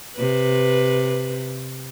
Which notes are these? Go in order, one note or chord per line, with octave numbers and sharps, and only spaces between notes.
C3 B4